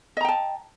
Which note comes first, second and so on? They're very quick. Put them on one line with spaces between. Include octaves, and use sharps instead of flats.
D#5 A#5 G5 A5